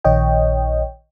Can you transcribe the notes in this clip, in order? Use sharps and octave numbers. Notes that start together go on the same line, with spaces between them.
A#1 D#3 C#5 D#5 G5